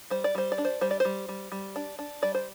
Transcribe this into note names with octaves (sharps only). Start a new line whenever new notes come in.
G3 C5
D5
G3 C5
D5
D4
C5
G3 C5
D5
G3 C5
G3
G3
D4
D4
G3 D5
C5